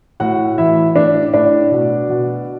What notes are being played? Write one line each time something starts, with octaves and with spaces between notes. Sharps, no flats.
A2 F#4 F#5
E3 E4 E5
A2 D4 D5
A2 D4 D5
B2
B2